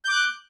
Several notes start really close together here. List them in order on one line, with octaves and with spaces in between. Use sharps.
G6 D6 F#6